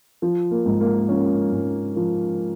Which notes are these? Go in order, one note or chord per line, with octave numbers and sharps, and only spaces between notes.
F3
A#3
G#2
A#3
F3 C#4
G#2
F3